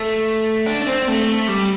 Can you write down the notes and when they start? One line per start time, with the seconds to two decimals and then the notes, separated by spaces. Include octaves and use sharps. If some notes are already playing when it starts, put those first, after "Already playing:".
Already playing: A3
0.66 D4
0.82 D4
0.87 C4
1.08 A3
1.48 G3